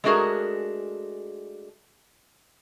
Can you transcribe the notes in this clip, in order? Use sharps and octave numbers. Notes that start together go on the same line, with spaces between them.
G#3 A3 D4 F#4 G#4 A#4